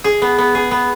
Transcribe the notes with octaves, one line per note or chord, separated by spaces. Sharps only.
G#4
B3
B3
G#4
B3